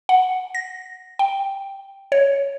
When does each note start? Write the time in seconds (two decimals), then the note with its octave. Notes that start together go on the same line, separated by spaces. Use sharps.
0.09 F#5
0.55 A#6
1.19 G5
2.12 C#5